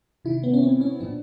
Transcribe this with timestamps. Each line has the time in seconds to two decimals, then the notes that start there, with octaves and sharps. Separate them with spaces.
0.25 C3 D#3 E4
0.43 B3
0.53 C#4
0.63 C4
0.81 C#4
1.00 A#2 F3 D4